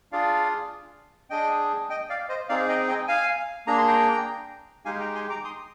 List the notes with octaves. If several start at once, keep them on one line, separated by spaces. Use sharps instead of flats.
D4 F4 G#4 D5 F5
D4 G#4 D#5 G5
D#5 G5
D5 F5
C5 D#5
C4 D#4 G#4 D5 F5
D#5 G5
D#5 G5
F5 G#5
A#3 D4 G#4 A#5
C6
G5 A#5
G#3 D#4 G4 F5 G#5
G5 A#5
G#5 C6
A#5 D6
C6 D#6